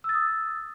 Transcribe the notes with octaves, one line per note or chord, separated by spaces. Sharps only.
D#6 E6 A6